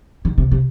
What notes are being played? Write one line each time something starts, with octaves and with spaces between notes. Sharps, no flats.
D#3
C3
C3